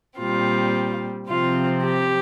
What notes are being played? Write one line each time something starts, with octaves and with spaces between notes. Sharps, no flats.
A#2 G3 C4 F4
C3 F3 C4 F4
G4